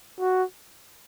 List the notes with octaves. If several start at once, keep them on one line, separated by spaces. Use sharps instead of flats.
F#4